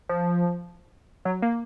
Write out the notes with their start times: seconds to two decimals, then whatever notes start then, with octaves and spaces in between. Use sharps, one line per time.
0.09 F3
1.25 F#3
1.42 A#3